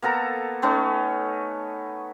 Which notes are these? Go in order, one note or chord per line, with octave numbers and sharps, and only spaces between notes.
A#3 B3 A4 A#5
A3 B3 C#4 D#4